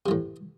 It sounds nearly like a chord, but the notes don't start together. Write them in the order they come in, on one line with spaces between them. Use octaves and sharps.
C3 E3 A2